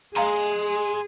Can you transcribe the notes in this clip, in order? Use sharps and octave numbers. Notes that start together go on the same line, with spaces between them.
G#4 F5 G#5 A#5 C6